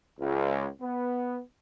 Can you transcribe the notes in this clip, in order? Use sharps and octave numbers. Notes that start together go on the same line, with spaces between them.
C#2
B3